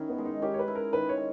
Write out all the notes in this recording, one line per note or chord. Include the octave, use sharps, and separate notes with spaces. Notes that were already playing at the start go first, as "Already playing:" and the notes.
Already playing: D#3 C#4 E4
B3
G#3
D#4
C#4 G4
C#5
B4
E4
A#4
D#3 B4
C#5
G#3